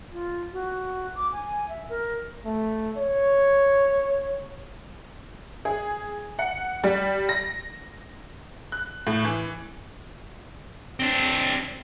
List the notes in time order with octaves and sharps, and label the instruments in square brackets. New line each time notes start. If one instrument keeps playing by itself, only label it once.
[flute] F4
F#4
D6
G#5
E5
A#4
[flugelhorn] A3
C#5
[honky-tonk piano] G#4
F#5
G3
A#6
F#6
A2
E3
[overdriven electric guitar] C4 D4